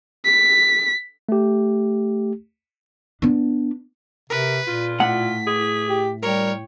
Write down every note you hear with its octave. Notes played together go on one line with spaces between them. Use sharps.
B6
A3 G4
B3 D4
C3 A#4 B4
A#2 F4
A2 F#5 B6
G#4
G4
G3 A#4 C#5 G5